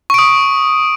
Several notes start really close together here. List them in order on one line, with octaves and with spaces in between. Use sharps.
C#6 D7 D#6